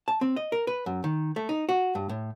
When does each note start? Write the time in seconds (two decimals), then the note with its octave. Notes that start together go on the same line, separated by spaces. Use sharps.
0.08 A5
0.21 C4
0.36 D#5
0.52 A#4
0.67 B4
0.86 F#2
1.04 D#3
1.36 A3
1.49 D#4
1.69 F#4
1.95 G2
2.09 A2